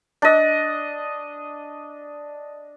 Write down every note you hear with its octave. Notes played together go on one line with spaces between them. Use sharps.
D4 D#5